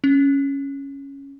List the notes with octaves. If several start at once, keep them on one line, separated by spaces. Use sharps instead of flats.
C#4